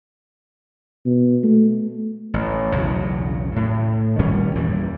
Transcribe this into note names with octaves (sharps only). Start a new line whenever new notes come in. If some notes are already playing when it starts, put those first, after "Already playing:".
B2
A3
A1
B1 E2 C#3 F#3
A2
A#2 D#3 G3 C#4
E2 A#2 E3 G3